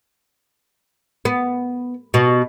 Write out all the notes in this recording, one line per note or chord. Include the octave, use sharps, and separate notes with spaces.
B3
B2